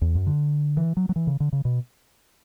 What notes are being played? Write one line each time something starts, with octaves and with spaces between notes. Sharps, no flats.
E2
F#2
D3
E3
F#3
F#3
E3
C#3
D3
C#3
B2